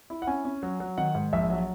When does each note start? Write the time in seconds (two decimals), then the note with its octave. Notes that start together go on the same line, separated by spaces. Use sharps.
0.10 E4
0.22 F#5
0.27 C#4 G#5
0.45 C#4
0.63 F#3
0.80 F#3
0.98 D#3 F#5
1.15 G#2
1.33 A#1 E5
1.50 F#3